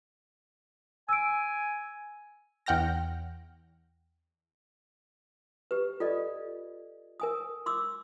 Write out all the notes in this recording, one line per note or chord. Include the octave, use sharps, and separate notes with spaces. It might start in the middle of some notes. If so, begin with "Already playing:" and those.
G#5 E6 D7
E2 F#5 G5 F6 A#6
G4 B4
F4 A4 D5 D#5
A#4 G#5 D#6
C6 D6 E6